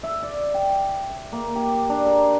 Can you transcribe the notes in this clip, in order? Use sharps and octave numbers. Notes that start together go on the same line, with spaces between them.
E5
D5
G5
A#3
G4
D4
A#4